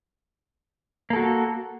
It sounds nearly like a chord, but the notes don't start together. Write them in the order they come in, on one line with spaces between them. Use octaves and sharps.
A#3 A4 F#4